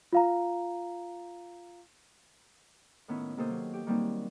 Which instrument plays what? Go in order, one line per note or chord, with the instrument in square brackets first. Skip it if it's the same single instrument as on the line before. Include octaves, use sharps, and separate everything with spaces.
[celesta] F4 F5 A#5
[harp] A2 D#3 B3 C#4 E4
C3 D#3 A#3 A4 C5 D#6
F#3
G4
D#3 F#3 G3 A#3 C4 D#4